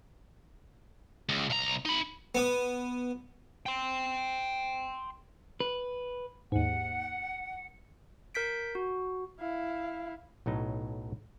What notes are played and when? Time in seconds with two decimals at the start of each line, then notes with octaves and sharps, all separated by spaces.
1.29 C#2
1.50 C2 A#5
1.85 D#4 B5
2.35 B3 D#6
3.66 G5 C6
5.60 B4
6.52 D#2 G#2 F#5
8.35 A#4 G6 B6 D7
8.75 F#4
9.40 E4 F5
10.46 B1 A2 F#3 D#4